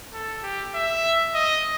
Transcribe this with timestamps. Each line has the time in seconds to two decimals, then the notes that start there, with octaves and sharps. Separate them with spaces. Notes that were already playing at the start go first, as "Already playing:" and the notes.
0.14 A4
0.43 G4
0.74 E5
1.34 D#5